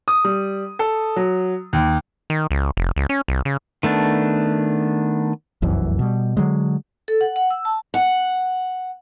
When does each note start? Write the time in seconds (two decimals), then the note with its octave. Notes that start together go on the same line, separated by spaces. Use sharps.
0.08 D#6
0.24 G3
0.79 A4
1.16 F#3
1.73 D#2
2.30 D#3
2.51 C#2
2.77 F1
2.96 C#2
3.09 C#4
3.28 C2
3.45 C#3
3.83 D#3 A3 B3 D4
5.62 F1 C2 F#2 E3
5.99 B2 G3
6.37 D3 F#3 G#3
7.08 A4
7.21 F#5
7.36 F#5
7.50 E6
7.65 A5
7.94 F#5